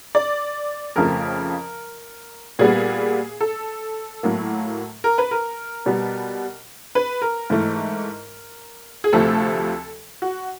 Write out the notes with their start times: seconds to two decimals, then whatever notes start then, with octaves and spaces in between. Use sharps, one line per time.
0.15 D5
0.96 F2 C#3 F3 A3 A#4
2.59 A#2 G3 B3 G#4
3.41 A4
4.23 A2 F#3 A#3
5.04 A#4
5.18 B4
5.31 A#4
5.86 B2 G3 B3
6.95 B4
7.22 A#4
7.50 G#2 E3 A3
9.04 G#4
9.13 D2 C3 F3 A3 A4
10.22 F#4